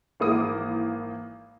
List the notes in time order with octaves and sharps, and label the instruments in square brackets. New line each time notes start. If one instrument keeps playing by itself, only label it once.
[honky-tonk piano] G#1 E3 A#3 D6 D#6